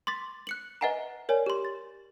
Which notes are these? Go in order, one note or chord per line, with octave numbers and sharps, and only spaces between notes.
C6 D6 A6 B6
F#6 C#7 F#7
B4 D#5 E5 F#5 G#5 A#5
A#4 C#5 D5 G#5
G4 C6
A6